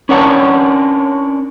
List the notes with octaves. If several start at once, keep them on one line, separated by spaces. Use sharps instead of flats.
C#4 D4 A#4 C#5 F#5 A5